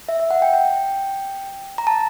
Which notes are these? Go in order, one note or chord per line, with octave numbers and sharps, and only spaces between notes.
E5
E5
F#5
G5
G5
A#5
A5